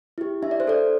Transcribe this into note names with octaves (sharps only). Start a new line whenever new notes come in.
E4 G4
D4 E5
D5
C5
A4 D5